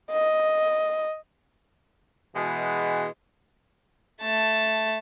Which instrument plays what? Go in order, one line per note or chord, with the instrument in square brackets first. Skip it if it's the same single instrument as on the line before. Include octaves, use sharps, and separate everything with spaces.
[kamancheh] D#5
[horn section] B2 E3 G#3
[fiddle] A3 A5